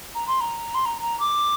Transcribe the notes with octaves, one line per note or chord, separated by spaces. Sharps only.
A#5
C6
A#5
C6
A#5
A#5
D6